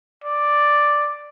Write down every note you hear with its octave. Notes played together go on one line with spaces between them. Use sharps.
D5